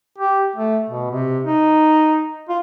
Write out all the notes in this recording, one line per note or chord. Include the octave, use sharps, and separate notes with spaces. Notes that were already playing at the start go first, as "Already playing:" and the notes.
G4
A3
B2
C3
D#4
F4